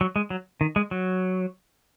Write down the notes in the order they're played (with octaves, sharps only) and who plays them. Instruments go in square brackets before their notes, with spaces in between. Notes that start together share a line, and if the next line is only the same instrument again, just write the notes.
[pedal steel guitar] F#3
G#3
F#3
D#3
G#3
F#3